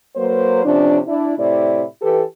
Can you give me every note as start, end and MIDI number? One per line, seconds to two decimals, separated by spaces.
0.17 0.64 54
0.17 0.64 58
0.17 0.64 71
0.17 0.64 72
0.65 0.99 48
0.65 0.99 53
0.65 0.99 61
0.65 0.99 62
1.08 1.35 62
1.08 1.35 64
1.38 1.84 45
1.38 1.84 48
1.38 1.84 64
1.38 1.84 74
2.02 2.22 52
2.02 2.22 67
2.02 2.22 69
2.02 2.22 71